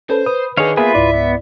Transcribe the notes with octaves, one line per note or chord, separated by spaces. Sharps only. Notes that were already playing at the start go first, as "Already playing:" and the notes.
C#4 A4 B4 C5
B4 D#6
D3 D#3 D#4 G#4 C#5 F5
A#3 B3 F4 G#4 B4 E5
C#2 G#2 E4 D5
B3